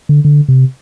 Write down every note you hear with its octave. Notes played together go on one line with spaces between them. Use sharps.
D3
D3
C3